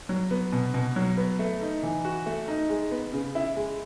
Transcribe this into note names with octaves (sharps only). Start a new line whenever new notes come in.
F#3
B3
B2
B2
F#3
B3
A3
D#4
E3
F#4
A3
D#4
G#3
B3
C#3
E4
G#3